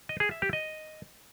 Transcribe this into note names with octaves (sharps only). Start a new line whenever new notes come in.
D#5
G#4
E5
G4
D#5